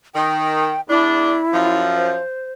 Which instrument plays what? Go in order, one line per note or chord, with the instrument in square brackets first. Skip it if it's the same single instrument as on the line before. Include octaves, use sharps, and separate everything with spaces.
[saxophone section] D#3 [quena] G5
[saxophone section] E2 D4 [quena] E4
[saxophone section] F#2 F3
[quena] C5